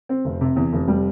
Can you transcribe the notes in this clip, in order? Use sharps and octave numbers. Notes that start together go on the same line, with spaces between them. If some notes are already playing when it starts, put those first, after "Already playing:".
C4
F1
C3
E2
F1
G3